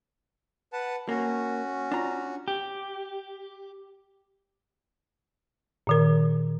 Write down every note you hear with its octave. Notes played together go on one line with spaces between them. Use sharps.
B4 F#5 A5
A#3 C#4 F#4
D4 F4 A#5
G4
A#2 D#3 A#4